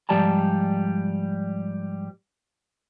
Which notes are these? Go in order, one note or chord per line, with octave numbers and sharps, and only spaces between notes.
G#2 F3 G3 D5 A5 A#5